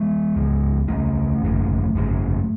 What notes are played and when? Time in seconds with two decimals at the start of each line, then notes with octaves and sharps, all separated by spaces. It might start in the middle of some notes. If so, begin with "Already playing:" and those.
Already playing: G#3 B3
0.36 C#2 C#3
0.88 C#2 C#3 A3 C#4
1.42 G#1 F#2 C#3
1.95 G#1 F#2 C#3